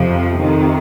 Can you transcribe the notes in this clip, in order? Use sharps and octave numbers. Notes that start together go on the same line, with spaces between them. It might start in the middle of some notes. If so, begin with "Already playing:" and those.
Already playing: F2 C3 F3
F2 C3 D#3